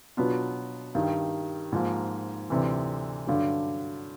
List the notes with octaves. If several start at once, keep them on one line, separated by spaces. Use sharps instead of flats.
B2 F#3 B3 D4 F4
G2 D#3 G3
G#2 F3 A#3
D2 C3 E3
G2 D3 F#3